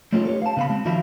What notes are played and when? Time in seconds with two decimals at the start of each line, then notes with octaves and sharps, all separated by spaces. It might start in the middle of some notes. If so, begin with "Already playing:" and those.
0.12 A3 A#3 C#4 D#4 F4 A4
0.25 G4 B4 C#5
0.42 F5 A5
0.57 C#3 B3 B4 F5 B5
0.70 G#3 C4
0.85 D#3 F3 F#4 E5 F5 B5